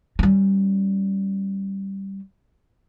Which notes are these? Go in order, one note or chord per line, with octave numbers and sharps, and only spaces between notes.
G3 C#4